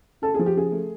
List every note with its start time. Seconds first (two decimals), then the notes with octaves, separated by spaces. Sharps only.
0.22 C#3 A4
0.34 F3 G#4
0.46 G4
0.56 C#3 G#4
0.72 A3